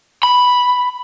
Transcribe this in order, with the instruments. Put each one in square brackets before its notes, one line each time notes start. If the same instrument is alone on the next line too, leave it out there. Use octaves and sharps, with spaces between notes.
[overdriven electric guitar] B5